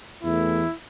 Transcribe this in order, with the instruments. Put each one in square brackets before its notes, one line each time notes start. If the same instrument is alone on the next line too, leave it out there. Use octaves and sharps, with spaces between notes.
[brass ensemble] E2 E3 A3 E4